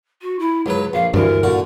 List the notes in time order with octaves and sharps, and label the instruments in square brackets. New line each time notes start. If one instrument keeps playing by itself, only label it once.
[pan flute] F#4
E4
[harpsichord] C#2 B4 [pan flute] F#3
[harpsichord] A#1 [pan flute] F5
[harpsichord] D2 [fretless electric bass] G2 E3 [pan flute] A#4
[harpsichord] A#2 D3 F#4